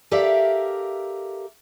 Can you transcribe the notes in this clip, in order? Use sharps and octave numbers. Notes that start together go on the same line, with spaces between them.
G4 A4 A#4 D5 E5 F5